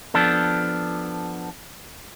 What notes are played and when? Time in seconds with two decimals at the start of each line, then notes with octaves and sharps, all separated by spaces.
0.14 F3 B3 D4 A4